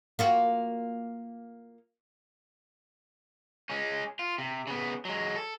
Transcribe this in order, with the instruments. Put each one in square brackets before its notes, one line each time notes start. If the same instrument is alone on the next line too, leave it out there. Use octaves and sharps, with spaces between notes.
[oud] A#3 F4 F#4
[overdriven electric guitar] G#3 C#4
F4
C3
C#3 B3
F#3 G#3
A4